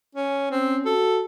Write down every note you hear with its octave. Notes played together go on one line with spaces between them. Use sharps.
C#4
C4 C#4
F#4 A4